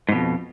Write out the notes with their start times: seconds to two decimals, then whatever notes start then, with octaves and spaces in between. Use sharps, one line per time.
0.09 G#2
0.12 B2
0.15 F2